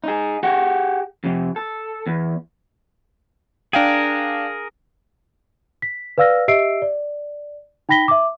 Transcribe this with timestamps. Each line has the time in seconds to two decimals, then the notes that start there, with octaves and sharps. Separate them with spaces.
0.04 D#4 G#4
0.43 G4 G#4 F#5
1.24 F2 C3
1.56 A4
2.07 E2
3.73 D4 G#4 A#4 F5 G5
5.82 B6
6.18 B4 D5 F5 E6 F6 A#6
6.48 G4 D#5 E5 E6 C7 D7
6.82 D5
7.89 D#4 G5 B5 A#6 B6 G7
8.08 E5 D6